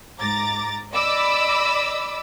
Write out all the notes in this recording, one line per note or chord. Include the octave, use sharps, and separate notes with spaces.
G#2 A#5 D6 A6
D5 D#5 B5 D6 E6